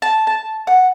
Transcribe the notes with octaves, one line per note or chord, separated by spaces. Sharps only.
A5
A5
F#5